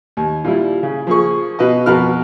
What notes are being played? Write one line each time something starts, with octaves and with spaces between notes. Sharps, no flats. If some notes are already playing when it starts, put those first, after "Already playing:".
D#2
A#2 G3 E4
C#3
F3 A#3 G#4 C#6
B2 B4 D#5
F2 B2 F#4 A#4 B4 F6